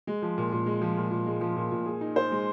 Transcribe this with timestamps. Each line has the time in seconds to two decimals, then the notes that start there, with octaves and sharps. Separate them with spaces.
0.07 G#3
0.22 F3
0.38 A#2
0.52 A#2
0.66 G#3
0.82 F3
0.97 A#2
1.11 A#2
1.26 G#3
1.41 F3
1.56 A#2
1.72 A#2
1.86 G#4
2.01 D#4
2.16 C5
2.32 G#3